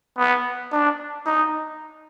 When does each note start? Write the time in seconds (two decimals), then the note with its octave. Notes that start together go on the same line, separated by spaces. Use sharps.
0.17 B3
0.72 D4
1.26 D#4